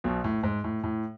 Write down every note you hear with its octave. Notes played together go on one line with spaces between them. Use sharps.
B1 B2
A2
G#2
A2
A2